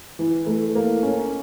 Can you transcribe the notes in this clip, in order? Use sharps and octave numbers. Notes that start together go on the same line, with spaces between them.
E3
A3
A#3
C#4